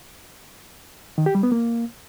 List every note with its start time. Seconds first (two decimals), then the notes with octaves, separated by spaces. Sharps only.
1.18 D#3
1.26 G4
1.35 G3
1.43 B3
1.52 A#3